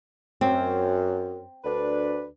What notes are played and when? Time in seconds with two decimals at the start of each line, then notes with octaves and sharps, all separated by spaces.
0.41 F#2 C4
1.64 D2 D4 B4